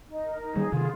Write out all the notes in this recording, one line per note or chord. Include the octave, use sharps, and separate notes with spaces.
D#4
A#4
D#4
D#3 G3 G#4
C3 D#3 F4